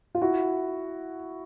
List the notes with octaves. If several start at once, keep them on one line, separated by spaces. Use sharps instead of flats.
F4
E4 F#4